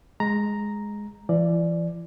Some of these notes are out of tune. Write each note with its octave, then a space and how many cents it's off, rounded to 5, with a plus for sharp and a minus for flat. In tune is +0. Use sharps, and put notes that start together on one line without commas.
G#3 +0 A#5 +0
E3 +40 D5 +5